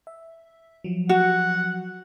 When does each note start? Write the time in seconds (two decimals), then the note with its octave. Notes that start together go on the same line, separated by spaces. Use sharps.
0.07 E5
0.84 F3 F#3
1.09 F#4 F#5